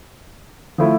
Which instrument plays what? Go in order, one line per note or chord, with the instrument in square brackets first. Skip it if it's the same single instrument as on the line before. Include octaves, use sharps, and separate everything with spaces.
[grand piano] F3 A3 E4